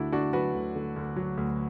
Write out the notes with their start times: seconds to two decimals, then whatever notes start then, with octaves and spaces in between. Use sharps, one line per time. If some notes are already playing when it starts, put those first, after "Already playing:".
Already playing: D2 D3 D4 E4 F#4
0.12 D2 D4 F#4
0.33 F#3 F#4 B4
0.55 D2
0.75 D3
0.96 D2
1.16 F#3
1.37 D2